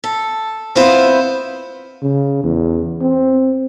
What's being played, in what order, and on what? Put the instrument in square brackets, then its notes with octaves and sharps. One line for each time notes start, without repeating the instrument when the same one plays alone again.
[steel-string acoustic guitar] A4
[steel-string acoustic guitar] B3 E4 C5 [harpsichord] C4 F4
[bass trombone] C#3
E2
C4